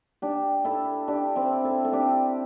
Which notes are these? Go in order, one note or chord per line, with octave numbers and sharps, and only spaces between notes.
D4 G4
E4 A4
D4 G4
C4 E4
E4 A4
A4
D4 G4